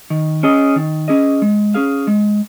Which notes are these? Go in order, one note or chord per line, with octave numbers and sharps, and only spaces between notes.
D#3
C#4 G#4 D#5
D#3
C#4 G#4 D#5
G#3
C#4 G#4 F5
G#3